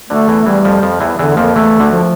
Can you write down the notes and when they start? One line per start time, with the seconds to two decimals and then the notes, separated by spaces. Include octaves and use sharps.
0.10 D2 D3 A3
0.28 E2 E3
0.46 E2 E3 G3
0.65 F2 F3
0.83 F2 F3
1.00 E2 E3
1.19 E2 D3 E3
1.37 F2 F3 A#3
1.55 E2 E3 A3
1.80 D2 D3
1.91 F3